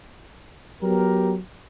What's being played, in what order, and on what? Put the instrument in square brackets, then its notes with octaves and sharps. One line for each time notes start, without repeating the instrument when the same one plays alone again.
[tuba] F#3 [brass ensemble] B3 G4 A#4